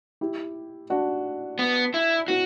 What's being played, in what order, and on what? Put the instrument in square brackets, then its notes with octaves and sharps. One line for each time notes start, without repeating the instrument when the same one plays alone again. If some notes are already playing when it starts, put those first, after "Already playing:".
[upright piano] E4 G4
D4 F#4
[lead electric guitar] B3
E4
[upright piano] C4 E4 [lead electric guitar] F#4